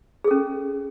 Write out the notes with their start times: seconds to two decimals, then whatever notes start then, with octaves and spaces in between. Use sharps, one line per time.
0.24 G#4
0.28 A4
0.31 C#4